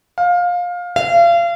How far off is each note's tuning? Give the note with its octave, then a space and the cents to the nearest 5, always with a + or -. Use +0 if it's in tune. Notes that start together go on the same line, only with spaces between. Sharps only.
F5 +20
F5 -35